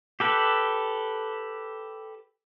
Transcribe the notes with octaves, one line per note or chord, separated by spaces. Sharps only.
G4 A4 B4